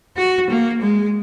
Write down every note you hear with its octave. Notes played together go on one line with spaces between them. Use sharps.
F#4
A#3
G#3